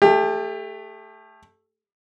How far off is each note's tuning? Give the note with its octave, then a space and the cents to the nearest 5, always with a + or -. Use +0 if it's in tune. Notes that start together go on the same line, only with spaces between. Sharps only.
A3 +0 G4 +30